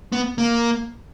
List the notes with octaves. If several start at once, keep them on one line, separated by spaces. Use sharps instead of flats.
B3
A#3